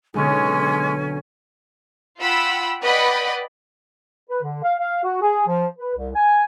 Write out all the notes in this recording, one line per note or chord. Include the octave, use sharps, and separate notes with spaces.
B1 D3 G#3 B3 C#4 G#5
F4 F#5 G5 B5 E6
B4 D5 D#5 F#5 G5 B5
B4
D3
F5
F5
F#4
G#4
F3
B4
C2
G#5